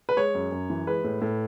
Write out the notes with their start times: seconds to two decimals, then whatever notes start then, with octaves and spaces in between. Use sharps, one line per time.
0.09 B4
0.17 G#3 C#5
0.35 F#2
0.52 F#2
0.70 E3
0.87 G#3 B4
1.04 A2
1.21 A2